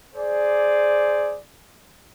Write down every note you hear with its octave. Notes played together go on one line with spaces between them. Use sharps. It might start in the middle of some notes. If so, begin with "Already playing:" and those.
G#4 C5 D5